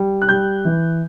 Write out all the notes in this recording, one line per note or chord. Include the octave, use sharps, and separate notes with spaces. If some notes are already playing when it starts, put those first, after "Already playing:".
Already playing: G3
F#6
G3 G6
E3